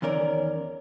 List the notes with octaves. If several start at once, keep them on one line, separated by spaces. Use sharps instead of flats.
E2 D#3 C#4 A#4 D5